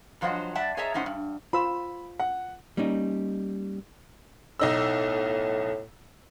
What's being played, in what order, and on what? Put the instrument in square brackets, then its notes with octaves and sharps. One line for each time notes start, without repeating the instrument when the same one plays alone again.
[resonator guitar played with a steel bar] G2 F3 F#3 C5 D#5 F#5
G3 D5 E5 F#5 A5
G#4 C#5 D#5 E5 A5 A#5
A2 C#4 D#4 C5 F#5
G2
[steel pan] F4 C5 E6 [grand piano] B5
[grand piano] F#5
[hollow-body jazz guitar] G3 A#3 C#4 D#4 D#5
[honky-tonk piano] B1 D#4 E6 [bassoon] A2